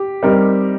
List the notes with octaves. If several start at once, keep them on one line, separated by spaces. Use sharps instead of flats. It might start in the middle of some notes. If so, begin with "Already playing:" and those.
Already playing: G4
G3 C4 D#4 A#4